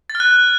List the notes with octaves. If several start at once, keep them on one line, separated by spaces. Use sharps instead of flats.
A6
F6
F#6